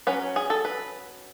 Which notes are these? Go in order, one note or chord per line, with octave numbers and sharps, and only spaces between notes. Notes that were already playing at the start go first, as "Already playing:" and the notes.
F#3 C#4 B4
G#4
A4
B4